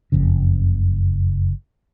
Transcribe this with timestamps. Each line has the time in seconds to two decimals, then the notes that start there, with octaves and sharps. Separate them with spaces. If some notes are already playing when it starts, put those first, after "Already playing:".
0.12 F#1 F2 C#3